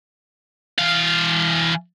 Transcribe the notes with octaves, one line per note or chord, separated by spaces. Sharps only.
E3 F5